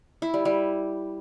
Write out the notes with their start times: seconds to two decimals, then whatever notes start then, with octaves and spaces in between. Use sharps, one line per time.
0.22 E4
0.34 G3
0.45 G3